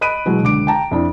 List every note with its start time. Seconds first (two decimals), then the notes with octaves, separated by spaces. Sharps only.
0.01 D#5 B5 F#6 D7 D#7
0.26 B2 E3 F#3 G#3
0.43 C#2 D3 D6 D7
0.67 G5 A5 A#5
0.91 F2 D4 E4